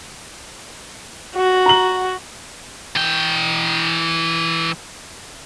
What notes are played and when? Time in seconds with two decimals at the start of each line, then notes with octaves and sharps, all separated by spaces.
1.35 F#4
1.66 A#5 F#7
2.96 E3 G5